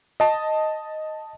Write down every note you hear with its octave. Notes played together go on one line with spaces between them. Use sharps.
D#5 A5